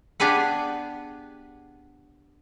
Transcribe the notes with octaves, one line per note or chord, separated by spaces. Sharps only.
B3 D4 G4 G#4 B4 F#5